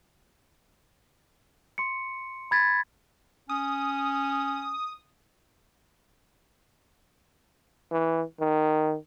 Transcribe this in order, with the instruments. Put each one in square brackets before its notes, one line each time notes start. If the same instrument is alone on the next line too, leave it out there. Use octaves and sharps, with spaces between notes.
[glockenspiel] C6 C#7
B5 G#6 A6 B6
[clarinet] C#4 [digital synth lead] D#6
[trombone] E3
D#3